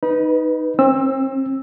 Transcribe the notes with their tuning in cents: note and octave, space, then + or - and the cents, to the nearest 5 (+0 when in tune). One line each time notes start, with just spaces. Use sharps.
D#4 +0 B4 +0 B5 -40
C4 +35 E6 +0